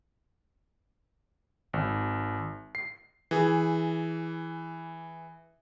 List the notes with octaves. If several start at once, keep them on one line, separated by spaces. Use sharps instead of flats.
G#1
C7
E3 G#4